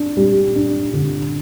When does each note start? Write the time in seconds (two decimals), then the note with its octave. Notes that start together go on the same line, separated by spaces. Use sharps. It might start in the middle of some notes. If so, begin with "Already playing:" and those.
Already playing: D4
0.17 G3
0.56 D4
0.94 D3